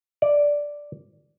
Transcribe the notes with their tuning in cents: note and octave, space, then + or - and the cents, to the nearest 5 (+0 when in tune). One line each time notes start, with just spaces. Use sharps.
D5 -5